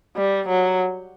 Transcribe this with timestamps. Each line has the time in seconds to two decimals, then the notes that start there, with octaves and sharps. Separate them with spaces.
0.16 G3
0.48 F#3